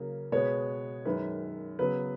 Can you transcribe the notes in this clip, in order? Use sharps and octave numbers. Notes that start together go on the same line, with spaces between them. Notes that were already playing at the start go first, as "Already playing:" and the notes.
Already playing: C#3 F#3 A#3
B2 G#3 B3 C#5
F#2 D#3 G#3 B4
C#3 F#3 B3 B4